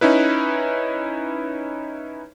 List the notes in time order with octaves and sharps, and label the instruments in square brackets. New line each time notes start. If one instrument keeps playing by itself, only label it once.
[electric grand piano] C#4 D#4 E4 B4